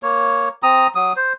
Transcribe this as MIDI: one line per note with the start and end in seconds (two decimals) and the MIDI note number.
0.03 0.49 58
0.03 0.49 73
0.63 0.87 60
0.63 0.87 82
0.63 0.87 87
0.95 1.13 54
0.95 1.13 87
1.16 1.33 72